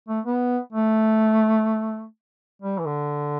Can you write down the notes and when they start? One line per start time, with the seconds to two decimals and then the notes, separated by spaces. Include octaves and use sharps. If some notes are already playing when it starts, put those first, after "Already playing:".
0.09 A3
0.25 B3
0.73 A3
2.62 G3
2.79 E3
2.85 D3